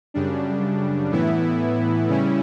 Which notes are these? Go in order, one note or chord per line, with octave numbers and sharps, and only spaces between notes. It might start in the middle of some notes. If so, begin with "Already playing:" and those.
F#2 C#3 G3 D4
A2 E3 B3 E4
C#3 G3 C#4 E4